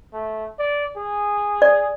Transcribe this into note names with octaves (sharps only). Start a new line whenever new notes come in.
A3
D5
G#4
D5